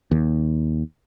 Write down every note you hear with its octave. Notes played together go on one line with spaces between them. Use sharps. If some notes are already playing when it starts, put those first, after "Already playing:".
D#2